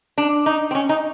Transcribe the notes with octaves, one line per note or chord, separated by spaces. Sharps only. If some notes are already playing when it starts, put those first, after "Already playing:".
D4
D#4
C4
C#4
D#4